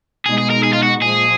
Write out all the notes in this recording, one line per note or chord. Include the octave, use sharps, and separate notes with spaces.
B2 G#3 D#4 G#4
G#4
A#4
G#4
F4
F#4
A#2 F3 G#3 G#4